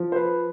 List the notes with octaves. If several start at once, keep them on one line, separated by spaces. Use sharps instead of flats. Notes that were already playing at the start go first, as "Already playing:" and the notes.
Already playing: F3
C5
B4